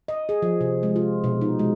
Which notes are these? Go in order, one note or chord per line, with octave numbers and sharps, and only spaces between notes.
D#5
G#4
F3
C3
G#3
F4
B2
D#4
G#3